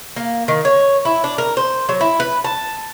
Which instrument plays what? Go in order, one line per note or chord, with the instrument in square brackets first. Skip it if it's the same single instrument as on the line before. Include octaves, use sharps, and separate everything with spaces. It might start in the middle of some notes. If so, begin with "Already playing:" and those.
[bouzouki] A#3
D#3
C#5
E4
D4
A#4
C5
F#3
E4
B4
A5